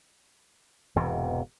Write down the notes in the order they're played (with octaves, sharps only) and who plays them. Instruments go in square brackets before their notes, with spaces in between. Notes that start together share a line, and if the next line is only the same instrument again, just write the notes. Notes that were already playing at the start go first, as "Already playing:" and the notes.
[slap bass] E1 E2 G#2 C3